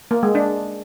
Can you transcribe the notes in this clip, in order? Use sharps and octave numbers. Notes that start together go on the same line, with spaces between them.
A#3
G#3
D4